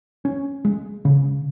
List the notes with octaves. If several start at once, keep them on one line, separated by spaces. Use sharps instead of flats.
C#4
G#3
C#3